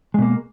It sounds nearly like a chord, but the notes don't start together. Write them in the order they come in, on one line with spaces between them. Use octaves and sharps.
G#3 B2 A#3